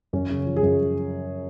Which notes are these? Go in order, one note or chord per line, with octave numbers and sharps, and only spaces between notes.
F#2 C#4 C#5
C#3
F3
G#4
F#2